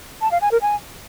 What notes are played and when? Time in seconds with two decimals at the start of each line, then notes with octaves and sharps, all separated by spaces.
0.21 A5
0.31 F5
0.42 G#5
0.52 A#4
0.62 G#5